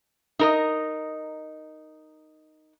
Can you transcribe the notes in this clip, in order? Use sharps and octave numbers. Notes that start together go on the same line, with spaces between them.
D#4 A#4 D#5